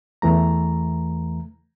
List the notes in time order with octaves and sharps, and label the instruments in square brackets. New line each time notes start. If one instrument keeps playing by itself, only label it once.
[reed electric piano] E2 E3 A3 A#5